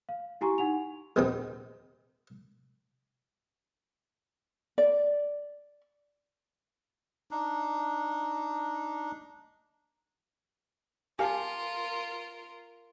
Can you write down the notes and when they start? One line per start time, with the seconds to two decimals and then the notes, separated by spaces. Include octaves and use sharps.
0.09 F5
0.41 E4 G4 G#5 A#5 C6 C#6
0.58 D#4 F#5 G#5 F7
1.16 A#1 E2 C3 D#3 D#4 D#6
4.78 D5
7.31 D4 D#4
11.19 F4 G4 A#4 F5 G#5 A5